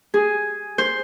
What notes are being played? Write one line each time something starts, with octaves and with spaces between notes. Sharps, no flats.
G#4
C5